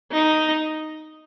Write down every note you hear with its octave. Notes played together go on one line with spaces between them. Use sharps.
D#4